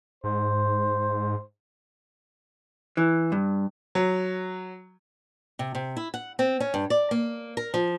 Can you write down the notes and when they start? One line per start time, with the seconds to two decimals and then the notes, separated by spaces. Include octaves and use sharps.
0.24 G#2 C5
2.97 E3
3.32 G2
3.95 F#3
5.59 C3
5.75 C3
5.97 E4
6.14 F#5
6.39 C4
6.60 C#4
6.74 G2
6.90 D5
7.11 A#3
7.57 A#4
7.74 F3